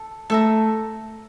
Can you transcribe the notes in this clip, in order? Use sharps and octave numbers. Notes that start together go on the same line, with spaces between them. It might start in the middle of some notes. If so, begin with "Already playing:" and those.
Already playing: A4
A3 A4 E5 A#5